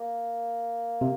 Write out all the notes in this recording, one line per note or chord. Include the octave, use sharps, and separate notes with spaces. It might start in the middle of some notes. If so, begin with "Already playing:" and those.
Already playing: A#3
C3